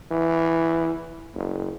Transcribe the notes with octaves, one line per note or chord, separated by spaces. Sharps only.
E3
F#1